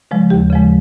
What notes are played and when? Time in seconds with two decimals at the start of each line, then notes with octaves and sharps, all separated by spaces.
0.11 C#3 F3 G#3
0.30 D#2 G4
0.50 C#3 F3 G#3